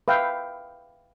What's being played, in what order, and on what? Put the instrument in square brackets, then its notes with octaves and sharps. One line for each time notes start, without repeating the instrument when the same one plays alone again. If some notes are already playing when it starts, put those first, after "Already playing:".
[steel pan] B4 E5 F5 G5